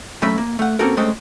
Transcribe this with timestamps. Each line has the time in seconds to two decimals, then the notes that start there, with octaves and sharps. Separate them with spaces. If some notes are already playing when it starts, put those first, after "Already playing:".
0.22 A#2 F#3 A3 C#4 E5 B5
0.38 A#3
0.59 A3 F#5
0.79 A#3 C4 C#4 F#4 A4 A#4
0.97 C3 G#3 A3 C4 C#4